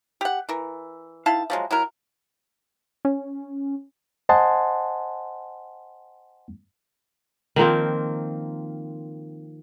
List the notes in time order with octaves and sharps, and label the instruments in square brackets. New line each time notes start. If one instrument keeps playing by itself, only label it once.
[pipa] G4 F#5
E3 A#4
D#3 E4 F5 A5
F3 F#3 G#3
F#3 E4 A#4
[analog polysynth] C#4
[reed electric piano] C5 D#5 F#5 G#5 A5 C6
[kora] D#3 F3 A#3 C4